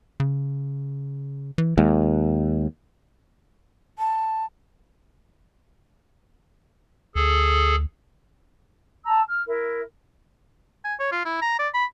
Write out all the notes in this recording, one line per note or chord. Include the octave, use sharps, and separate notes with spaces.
C#3
E3
D#2 G#3
A5
D2 G#4 A4
A5 A#5 E6
F6
E4 A#4
G#5
C#5
F4
E4
A#5
D5
B5